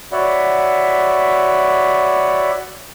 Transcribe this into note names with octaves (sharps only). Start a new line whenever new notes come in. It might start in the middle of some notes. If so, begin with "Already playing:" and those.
F#4 C#5 D5 E5 F#5 B5